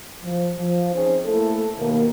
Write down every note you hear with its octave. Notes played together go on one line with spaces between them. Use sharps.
F3
F3
C4 C#4 D#4 G#4 C5
A3 A#3 E4 A4
D#2 B2 A#3